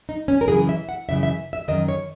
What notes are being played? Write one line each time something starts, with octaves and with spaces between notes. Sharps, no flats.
D#4
C#4
A#4
F#2 C#3 E3 G#4
E5
F#5
F#2 C#3 E3 E5
E5
E5
F#2 D#3 D#5
C#5